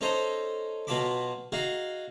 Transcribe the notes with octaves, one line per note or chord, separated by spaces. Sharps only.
C#4 D#4 A4 C5 D#5 A#5
B2 F#3 F4 A5 B5 D6
D#4 F#4 G#4 F5